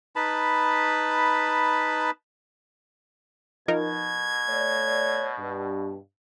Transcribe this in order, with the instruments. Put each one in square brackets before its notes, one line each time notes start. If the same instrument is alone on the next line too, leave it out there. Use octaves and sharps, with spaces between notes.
[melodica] D#4 B4 A5 B5
[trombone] B2 [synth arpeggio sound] F3 D#4 A#4 [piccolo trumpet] G#6
[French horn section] A3 C#5 D5
G2